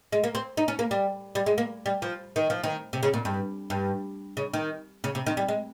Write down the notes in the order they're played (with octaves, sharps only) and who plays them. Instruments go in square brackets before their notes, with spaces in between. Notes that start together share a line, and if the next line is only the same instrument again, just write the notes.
[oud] G#3
A#3
C4
D#4
C#4
A#3
G3
G3
G#3
A#3
G3
F3
D#3
F3
D#3
C3
C#3
A#2
G2
G2
C#3
D#3
C#3
C3
D#3
G3
G#3